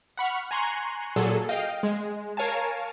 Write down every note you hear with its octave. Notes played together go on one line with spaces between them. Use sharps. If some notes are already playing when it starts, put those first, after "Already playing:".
F#5 B5 C#6 F6
G#5 A#5 C6 C#6 F#6
A#2 F#3 G#4 A4
D#5 F5 G5
G#3
A#4 C#5 F5 G#5 A5